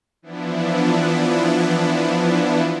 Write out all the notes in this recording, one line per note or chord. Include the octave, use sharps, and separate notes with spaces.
E3 F3 B3 D4 E4